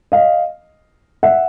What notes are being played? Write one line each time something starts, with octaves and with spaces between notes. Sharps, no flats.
D#5 F5
E5 F#5